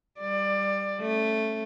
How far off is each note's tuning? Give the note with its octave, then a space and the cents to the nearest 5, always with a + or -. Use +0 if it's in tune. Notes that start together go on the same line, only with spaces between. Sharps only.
G3 +0 D5 +20
A3 +0 C#4 -20